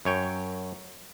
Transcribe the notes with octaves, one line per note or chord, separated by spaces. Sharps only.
F#2 C#5 G5